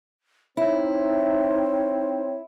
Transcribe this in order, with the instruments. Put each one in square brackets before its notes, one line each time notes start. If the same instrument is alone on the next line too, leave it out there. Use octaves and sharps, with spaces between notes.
[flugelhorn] C4 [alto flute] D#4 [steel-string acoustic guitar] E4 [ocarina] C#5